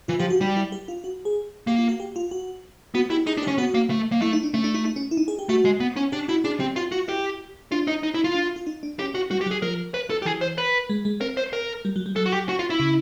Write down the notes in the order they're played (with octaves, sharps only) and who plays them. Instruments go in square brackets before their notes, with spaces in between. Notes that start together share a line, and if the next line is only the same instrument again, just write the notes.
[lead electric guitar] E3 [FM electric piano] F4
[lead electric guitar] F3 [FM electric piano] G4
[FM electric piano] F#4
[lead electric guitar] G3 [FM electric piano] D#4
[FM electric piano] E4
G4
F4
F#4
G#4
[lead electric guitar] A#3 [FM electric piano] G4
[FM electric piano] F4
F#4
G4
F4
F#4
[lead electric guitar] B3 [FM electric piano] F#4
[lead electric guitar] E4 [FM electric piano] G4
[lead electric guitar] D#4 [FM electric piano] G#4
[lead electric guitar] D4
[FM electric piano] G4
[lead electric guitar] C#4
[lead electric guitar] B3 [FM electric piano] F#4
[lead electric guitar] A#3
A3
A#3
[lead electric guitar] A3 [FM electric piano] E4
[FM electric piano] D#4
D4
[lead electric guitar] A3 [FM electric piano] C#4
[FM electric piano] D4
D#4
D#4
C#4
E4
D#4
G#4
G4
[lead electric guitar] A3 [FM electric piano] F#4
[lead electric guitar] G#3
B3
C#4
[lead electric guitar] D4 [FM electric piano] G4
[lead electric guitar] E4 [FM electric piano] F#4
[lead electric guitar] D4 [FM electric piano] G#4
[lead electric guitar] C4 [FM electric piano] G4
[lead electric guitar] F4 [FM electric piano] F#4
[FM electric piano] F4 [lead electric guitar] F#4
[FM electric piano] E4 [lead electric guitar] G4
[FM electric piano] D4 [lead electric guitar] F4
[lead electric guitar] D#4
D#4
E4
F4
[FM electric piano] D4
F4
D#4
D4
[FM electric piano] C#4 [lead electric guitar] G4
[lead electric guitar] F#4
[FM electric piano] G3 [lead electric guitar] F#4
[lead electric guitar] G4
[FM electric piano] F#3
[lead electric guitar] G#4
[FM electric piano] F3 [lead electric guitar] A#4
[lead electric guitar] B4
A4
G4
[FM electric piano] E3 [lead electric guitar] G#4
[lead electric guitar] C5
B4
[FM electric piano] G#3
G#3
[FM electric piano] C4 [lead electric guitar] A#4
[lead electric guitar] C5
A#4
[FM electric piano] G3
F#3
G3
[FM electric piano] F#3 [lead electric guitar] A4
[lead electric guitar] F#4
G4
F#4
F4
E4
[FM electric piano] C#3